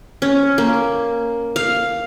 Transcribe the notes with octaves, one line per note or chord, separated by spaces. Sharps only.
C#4
A#3
F5